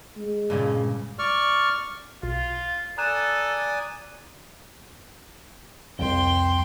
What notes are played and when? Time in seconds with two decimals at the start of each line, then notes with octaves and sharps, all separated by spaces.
0.17 G#3
0.50 G2 A#2 C#3
1.19 D5 C#6 F6
2.23 B1 F4
2.98 A4 D5 G#5 A#5 D#6 F#6 E7
5.99 C2 F2 G5 C6